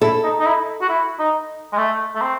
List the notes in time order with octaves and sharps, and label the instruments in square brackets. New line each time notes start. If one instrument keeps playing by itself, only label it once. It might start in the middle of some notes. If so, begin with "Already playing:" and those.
[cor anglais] E4 [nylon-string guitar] A4
[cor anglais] D#4
D#4
E4
F#4
E4
D#4
G#3
A3
A3
C4